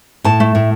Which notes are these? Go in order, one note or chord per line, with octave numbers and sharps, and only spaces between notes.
A2 A5
A3
A2